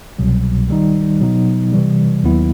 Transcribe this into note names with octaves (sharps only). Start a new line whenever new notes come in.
C2 B2 F#3
D#3 G3 D#4
B2 F#3 B3 D#4
C3 E3 G3
D#2 D#3 F#3 B3 E4